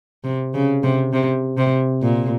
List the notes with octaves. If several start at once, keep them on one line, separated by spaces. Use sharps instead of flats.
C3
C#3
C3
C3
C3
A#2